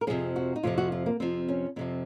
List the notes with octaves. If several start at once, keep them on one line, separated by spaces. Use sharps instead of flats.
A#4
F2 C3 F3 G#4
F#4
D#4
F2 C3 F3 F4
F#4
F4
A#3
F2 C3 F3 C4
C#4
F2 C3 F3 C4